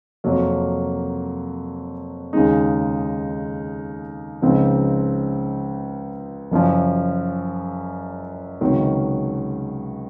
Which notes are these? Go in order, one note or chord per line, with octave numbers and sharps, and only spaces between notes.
F2 C3 F#3 A#3
D#2 C#3 G#3 D#4
C#2 C#3 F3 C4 D#4
F#1 F#2 F3
C#2 C3 D#3 F#3